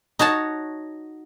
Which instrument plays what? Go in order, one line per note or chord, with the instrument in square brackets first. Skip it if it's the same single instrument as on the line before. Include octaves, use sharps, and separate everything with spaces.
[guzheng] D#4 F#4 C#5 A5